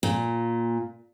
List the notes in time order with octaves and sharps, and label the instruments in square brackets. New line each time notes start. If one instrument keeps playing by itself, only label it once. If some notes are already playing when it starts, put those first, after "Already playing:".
[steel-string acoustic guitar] A#2